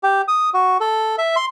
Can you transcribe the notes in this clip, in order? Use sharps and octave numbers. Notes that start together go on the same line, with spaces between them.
G4
D#6
F#4
A4
E5
C6